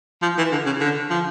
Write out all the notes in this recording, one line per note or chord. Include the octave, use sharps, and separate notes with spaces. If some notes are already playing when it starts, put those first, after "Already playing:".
F3
E3
D3
C#3
D3
F3